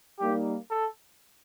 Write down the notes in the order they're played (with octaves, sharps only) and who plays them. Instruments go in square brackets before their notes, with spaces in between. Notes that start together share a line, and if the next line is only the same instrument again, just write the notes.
[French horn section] G3 A#3 D#4 [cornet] G4
[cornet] A4